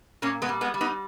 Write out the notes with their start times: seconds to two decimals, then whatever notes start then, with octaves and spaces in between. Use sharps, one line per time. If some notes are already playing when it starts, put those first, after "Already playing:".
0.22 A#2 A#3 C#4
0.42 G#3 B3
0.49 G3
0.61 G#3 B3
0.74 G3
0.81 B3 D#4